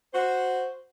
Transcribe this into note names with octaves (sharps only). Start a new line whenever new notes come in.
F#4 C5